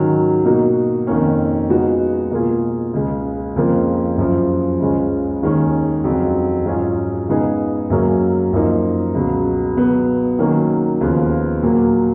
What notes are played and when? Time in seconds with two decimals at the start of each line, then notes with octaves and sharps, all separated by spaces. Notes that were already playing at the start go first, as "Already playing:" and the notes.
Already playing: G#2 D#3 F#3 C#4
0.45 B2 A#3 D#4 F#4
1.07 F2 D#3 A#3 C#4
1.69 C#3 G#3 B3 D#4 F#4
2.31 B2 A#3 F4 G#4
2.93 C#2 C#3 G#3
3.56 F2 C#3 F3 A#3
4.18 F#2 C#3 F3
4.80 C#2 C#3 F3 G#3 C#4
5.42 D#2 D#3 G#3 C#4 G#4
6.04 F2 C#3 F#3
6.66 G#2 F#3 C#4 F4 G#4
7.28 C#3 G#3 B3 D#4 G#4
7.90 F#2 C#3 F#3 A#3 C#4
8.53 F#2 F3 A#3 D#4
9.15 C#2 B2 F#3
9.77 B2 F#3 B3
10.39 D#3 F#3 A#3 C#4
11.01 D#2 C#3 F3 B3
11.63 A#2 F#3 A#3